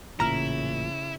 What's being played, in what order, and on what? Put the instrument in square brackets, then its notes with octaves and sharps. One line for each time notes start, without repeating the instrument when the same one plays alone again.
[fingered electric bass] A1 A#2 [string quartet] C#3 [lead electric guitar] E4 [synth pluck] A#5 F6